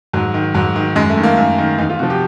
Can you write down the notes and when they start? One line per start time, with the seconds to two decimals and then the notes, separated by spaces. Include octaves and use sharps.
0.13 G#2 F#3
0.34 D#3
0.54 G#2 F#3
0.76 D#3
0.96 F#2 G#3
1.10 A3
1.17 D#3
1.23 A#3
1.37 F#2
1.58 D#3
1.78 E2 D#4
1.90 F4
1.99 C3 F3 F#4
2.10 G4